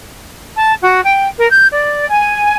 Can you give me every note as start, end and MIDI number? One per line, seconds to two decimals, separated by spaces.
0.57 0.74 81
0.82 1.01 66
1.04 1.27 79
1.38 1.49 70
1.50 1.68 91
1.72 2.06 74
2.09 2.57 80